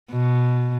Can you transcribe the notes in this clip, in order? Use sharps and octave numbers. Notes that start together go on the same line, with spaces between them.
B2